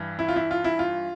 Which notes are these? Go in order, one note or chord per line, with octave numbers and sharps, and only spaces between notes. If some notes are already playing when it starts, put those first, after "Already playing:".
Already playing: G2 E3
E4
F4
E4
F4
E4
F4